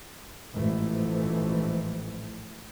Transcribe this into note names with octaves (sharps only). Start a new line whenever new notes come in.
A1 G#2 E3 F3 A3